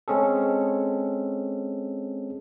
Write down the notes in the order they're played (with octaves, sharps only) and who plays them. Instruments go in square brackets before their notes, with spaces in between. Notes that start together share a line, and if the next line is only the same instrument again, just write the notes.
[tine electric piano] G#3 C4 C#4 G#4 A4